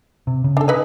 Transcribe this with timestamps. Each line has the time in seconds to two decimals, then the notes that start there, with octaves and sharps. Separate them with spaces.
0.27 C3
0.44 C#3
0.57 D4 A4
0.68 D#4 B4 D#5